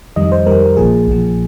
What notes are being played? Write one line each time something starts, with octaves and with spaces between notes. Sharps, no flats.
F2 D#3 G3 D#5
C5
F2 D#3 G3 A#4
A#1 A#2 F3 G#4
A#1 A#2 F3